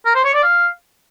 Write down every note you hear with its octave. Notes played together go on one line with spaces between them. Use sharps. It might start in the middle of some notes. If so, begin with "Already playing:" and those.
A#4
C5
C#5
D5
F5